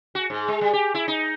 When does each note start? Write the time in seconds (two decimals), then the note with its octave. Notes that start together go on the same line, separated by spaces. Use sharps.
0.15 F#4
0.30 G#2
0.48 G#3
0.61 G3
0.73 G4
0.94 E4
1.08 D#4